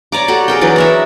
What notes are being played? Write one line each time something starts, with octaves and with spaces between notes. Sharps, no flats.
C#5 D5 A#5 D6
F#4 G4 A4
G#4 A#4 G5
E3 F#3 D4
F#4 A#4 E5